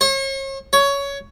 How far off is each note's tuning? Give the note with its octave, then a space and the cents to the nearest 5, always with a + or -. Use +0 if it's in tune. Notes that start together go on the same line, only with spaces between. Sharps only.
C#5 -40
C#5 +15